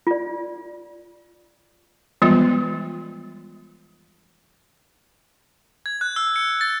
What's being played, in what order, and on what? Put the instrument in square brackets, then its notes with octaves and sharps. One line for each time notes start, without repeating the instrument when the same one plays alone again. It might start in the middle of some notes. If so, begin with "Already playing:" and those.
[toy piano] F4 D5
[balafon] E3 F3 G3 G#3 B3 F4
[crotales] G#6
F#6
E6
C#7
A6